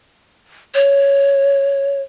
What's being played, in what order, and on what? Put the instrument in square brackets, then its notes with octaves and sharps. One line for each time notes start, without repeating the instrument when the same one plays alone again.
[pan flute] C#5